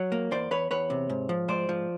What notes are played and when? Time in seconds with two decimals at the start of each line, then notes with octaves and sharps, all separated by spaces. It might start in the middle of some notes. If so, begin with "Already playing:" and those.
Already playing: F#3 C#5
0.12 A#3
0.31 E2 C5 D5
0.51 E2 B4 C#5
0.71 E2 B4 C#5
0.90 C3
1.09 G#2
1.29 F3
1.48 G#2 C5 D5
1.69 F3